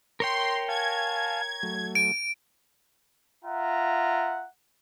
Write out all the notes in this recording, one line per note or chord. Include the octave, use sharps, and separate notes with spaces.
A#4 C#5 G5 C6
F5 G#5 A5 G#6
F#3 A3
D7
F4 E5 F#5 A#5